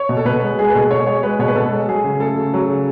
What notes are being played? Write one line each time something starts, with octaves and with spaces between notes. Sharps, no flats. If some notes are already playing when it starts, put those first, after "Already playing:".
Already playing: C#5
B2
A4
B2 B4
G#3
G#3 G#4
B4
B2 A4
B2 C#5
G#3 C#5
G#3 B4
B2 C#5
B4
B2 A4
G#3
F#3 G#4
C#3
A3 A4
C#3
F#3
C#3